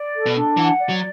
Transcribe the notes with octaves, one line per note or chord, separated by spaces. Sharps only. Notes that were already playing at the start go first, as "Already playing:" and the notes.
Already playing: D5
A4
B2
D4
E3 F#5
D5
F#3